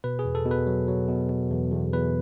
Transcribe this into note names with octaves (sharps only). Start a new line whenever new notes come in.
B2 B4
G#4
E2
A4
B2
B4
F#3
F#3
B2
B2
E2
E2
E2 B4